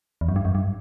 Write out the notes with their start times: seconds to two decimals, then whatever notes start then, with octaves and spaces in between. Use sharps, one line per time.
0.21 E2
0.29 F#2
0.36 G2
0.45 F#2
0.55 G2